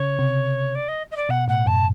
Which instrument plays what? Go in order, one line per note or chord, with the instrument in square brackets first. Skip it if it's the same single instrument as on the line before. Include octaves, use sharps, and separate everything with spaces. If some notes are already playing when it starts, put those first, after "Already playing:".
Already playing: [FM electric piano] C#3 [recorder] C#5
[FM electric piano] C3
[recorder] D5
D#5
D#5
D5
[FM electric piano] B2 [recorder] F#5
[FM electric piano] A2 [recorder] F#5
[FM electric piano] F#2 [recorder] A5